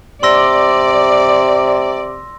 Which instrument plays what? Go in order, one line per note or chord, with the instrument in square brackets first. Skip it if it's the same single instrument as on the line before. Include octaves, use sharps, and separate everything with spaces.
[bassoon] C3 [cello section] D5 [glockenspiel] C6 E6 A#6